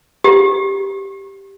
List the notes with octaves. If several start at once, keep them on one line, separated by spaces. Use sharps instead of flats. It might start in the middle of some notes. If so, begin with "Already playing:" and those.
G4